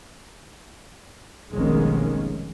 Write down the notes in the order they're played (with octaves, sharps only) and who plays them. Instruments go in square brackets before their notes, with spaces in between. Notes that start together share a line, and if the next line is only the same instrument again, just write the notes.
[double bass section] F1 B1 D#3 G#3 A#3 C#4